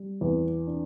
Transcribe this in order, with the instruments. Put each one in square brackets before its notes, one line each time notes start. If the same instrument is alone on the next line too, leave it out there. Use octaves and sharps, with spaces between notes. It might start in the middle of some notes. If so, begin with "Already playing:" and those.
Already playing: [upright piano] G3
E2
D4